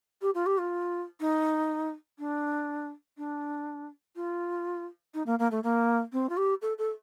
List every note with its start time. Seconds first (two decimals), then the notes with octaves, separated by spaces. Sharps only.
0.22 G4
0.35 F4
0.46 G4
0.58 F4
1.20 D#4
2.19 D4
3.18 D4
4.16 F4
5.14 D#4
5.26 A#3
5.39 A#3
5.51 A3
5.63 A#3
6.13 C4
6.29 F4
6.37 G4
6.62 A4
6.78 A4